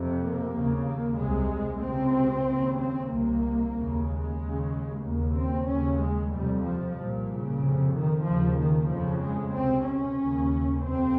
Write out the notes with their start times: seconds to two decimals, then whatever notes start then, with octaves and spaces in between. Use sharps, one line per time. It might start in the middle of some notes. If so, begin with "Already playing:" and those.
Already playing: F2 C3
0.22 A#3
0.54 D#2 C#3
0.86 A#3
1.18 C2 C3 G#3
1.82 C#2 C3 C4
2.47 D#2 C#3
2.79 C4
3.11 C2 C3 A#3
3.75 D#2 C#3
4.07 G#3
4.39 D#2 C#3
5.03 D#2 C#3 A#3
5.36 C4
5.68 D#2 C#3 C#4
6.00 G#3
6.32 F2 C3 G3
6.64 F3
6.96 C2 A#2
7.28 C#3
7.60 F2 C3
7.93 D#3
8.24 D#2 C#3 F3
8.57 D#3
8.89 F2 C#3 F3
9.21 G#3
9.53 C#2 C3 C4
9.85 C#4
10.17 D#2 C#3
10.82 F2 C3 C4